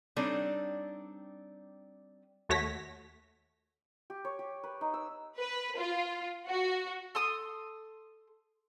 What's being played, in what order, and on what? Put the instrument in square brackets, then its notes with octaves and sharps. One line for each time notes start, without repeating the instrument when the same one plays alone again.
[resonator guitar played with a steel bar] G3 C4 D4 D#4 A4 C#5
[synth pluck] D#2 A3 F#4 C#5 A#6 B6
[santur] G4
C#5
G4
B4
D#4
E6
[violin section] B4
F4
F#4
[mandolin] A4 C6 D#6